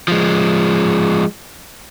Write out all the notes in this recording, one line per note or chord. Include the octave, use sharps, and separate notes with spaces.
F3 G#3